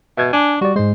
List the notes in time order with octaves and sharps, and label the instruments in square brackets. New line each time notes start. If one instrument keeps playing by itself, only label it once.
[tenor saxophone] B2 [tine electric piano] E5 G#6
[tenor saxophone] D4 [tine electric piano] G#5
[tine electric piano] G3 D5 [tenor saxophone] F#4
[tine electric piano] G#2 G#3 [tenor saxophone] C5